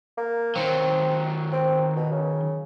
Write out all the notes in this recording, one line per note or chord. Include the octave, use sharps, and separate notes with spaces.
A#3
D#3 F#3 C4
C4
B2
C#3